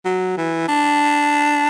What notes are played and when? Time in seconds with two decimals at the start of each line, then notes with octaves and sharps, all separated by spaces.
0.05 F#3
0.38 E3
0.68 D4